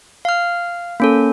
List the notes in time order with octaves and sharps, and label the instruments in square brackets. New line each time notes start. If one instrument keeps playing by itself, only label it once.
[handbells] F5 F6
A#3 C#4 A4